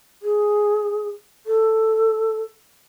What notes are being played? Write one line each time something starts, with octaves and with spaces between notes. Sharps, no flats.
G#4
A4